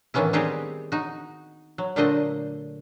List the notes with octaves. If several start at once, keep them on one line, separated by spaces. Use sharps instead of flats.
A2 D#3 E3 B3 C#4 E4
G3 B3 C4 D#4 G4 G#4
D#4 F#4
F#3
A#2 D3 A3 D4 C5 D#5